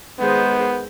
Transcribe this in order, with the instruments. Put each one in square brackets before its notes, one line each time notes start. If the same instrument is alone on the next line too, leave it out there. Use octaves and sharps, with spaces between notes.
[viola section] D#3 G#3 C5 [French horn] B3